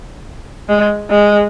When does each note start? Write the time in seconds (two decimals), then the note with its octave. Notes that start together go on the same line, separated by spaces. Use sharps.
0.69 G#3
1.10 G#3